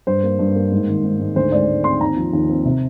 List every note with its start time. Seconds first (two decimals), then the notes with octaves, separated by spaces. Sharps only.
0.07 G2 C5
0.23 A#3
0.39 G2
0.55 A#3
0.72 G#2
0.88 D#3
1.04 G#2
1.20 G#2
1.36 D2 C5
1.52 G#3 D5
1.68 G#3
1.84 C4 C6
2.00 D#2 A#5
2.17 F3
2.33 D#2
2.49 C4
2.65 C3